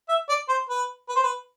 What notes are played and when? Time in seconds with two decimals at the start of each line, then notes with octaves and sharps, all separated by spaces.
0.09 E5
0.29 D5
0.49 C5
0.70 B4
1.09 B4
1.16 C5
1.23 B4